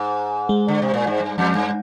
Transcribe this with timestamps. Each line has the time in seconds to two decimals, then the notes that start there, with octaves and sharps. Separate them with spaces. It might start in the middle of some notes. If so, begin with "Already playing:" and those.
Already playing: G#2
0.49 G#3
0.68 D3
0.82 C3
0.94 A#2
1.07 G#2
1.20 G2
1.38 F2
1.55 G2